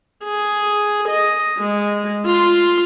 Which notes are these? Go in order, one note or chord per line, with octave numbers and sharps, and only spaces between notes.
G#4
D#5
G#3
F4 C6